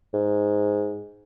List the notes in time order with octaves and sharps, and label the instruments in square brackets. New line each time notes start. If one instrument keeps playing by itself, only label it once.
[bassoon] G#2